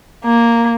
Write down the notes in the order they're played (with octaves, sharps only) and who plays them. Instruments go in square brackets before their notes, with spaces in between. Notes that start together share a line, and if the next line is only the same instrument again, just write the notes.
[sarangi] A#3